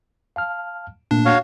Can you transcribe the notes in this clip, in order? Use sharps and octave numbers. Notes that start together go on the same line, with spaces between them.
F5 A5 F6
A#2 A3 A#3 D4
F#4 C#5 F5